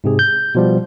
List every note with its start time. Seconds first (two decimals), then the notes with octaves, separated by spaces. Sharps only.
0.04 G#2 C3 G#4
0.19 G6
0.55 B2 F3 G3